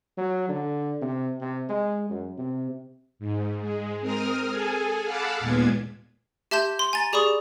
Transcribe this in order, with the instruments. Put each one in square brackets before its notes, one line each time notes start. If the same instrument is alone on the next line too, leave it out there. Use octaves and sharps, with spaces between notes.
[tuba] F#3
D3
C3
C3
G#3
F#2
C3
[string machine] G#2
G#3
C4 A#4 D#6 F6
G#4 A4 G#5
F5 F#5 A5 B5 D6 E6
D#2 A#2 G#3 B3 F4 G#6
[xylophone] G4 E5 A5 C6 G6 E7
C6
G#5 A#5 A6
G4 G#4 D5 B5 C#6 D#6